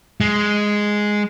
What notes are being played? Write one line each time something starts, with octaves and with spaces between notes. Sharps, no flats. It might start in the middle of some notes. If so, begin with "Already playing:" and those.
G#3